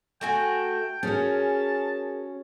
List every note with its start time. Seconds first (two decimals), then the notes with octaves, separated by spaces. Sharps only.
0.21 A3 F#4 G5 G#5
1.03 C#4 F#4 G#4 A#4 A5